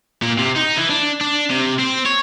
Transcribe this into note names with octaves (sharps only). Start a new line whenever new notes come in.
A#2
C3
D#4
E3
D4
D4
C3
C4
C#5